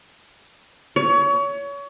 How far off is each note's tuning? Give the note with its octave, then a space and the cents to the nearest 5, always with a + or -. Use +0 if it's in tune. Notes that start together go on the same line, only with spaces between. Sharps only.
C#5 +30